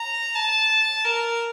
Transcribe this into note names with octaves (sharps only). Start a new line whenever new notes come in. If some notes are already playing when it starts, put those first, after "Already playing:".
Already playing: A#5
A5
A#4